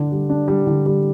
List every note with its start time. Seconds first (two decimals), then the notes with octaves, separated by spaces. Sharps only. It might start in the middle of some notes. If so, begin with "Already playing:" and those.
Already playing: D3 D4
0.12 G3
0.29 D4
0.48 G3
0.67 D3
0.86 G3